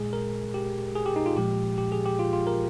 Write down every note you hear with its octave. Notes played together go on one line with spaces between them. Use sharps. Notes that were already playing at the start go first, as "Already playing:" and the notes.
Already playing: A#2 G#3 G#4
A#4
G4
G#4
G4
D#4
F4
A#2 F3 G#3 G4
G4
G#4
G4
F4
F4
A#4